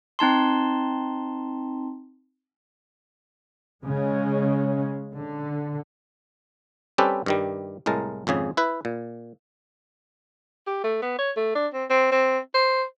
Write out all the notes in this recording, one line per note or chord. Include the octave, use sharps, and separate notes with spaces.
C4 D#4 A5 C6
C#3 G#3 C#4
D3
G3 C4 C#4 G4 A4 B4
G2 D#3 G3
C2 A2 G#3 A#4 A5
G#1 F2 C#3 G#4
E4 B4
A#2
G4
A3
B3
C#5
A3
D4
C4
C4
C4
C5